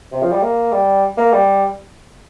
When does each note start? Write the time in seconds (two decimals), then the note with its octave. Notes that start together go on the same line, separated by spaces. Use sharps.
0.12 C3
0.22 F3
0.32 G3
0.42 A#3
0.72 G3
1.17 A#3
1.32 G3